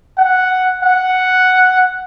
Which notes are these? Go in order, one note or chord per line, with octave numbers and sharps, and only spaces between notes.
F#5
F#5